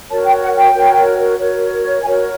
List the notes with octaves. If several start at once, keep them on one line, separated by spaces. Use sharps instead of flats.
F#4 A#4 C#5 A5
G5
F#5
G5
F#4 A#4 C#5
F#4 A#4 C#5
F#4 A#4 C#5 G#5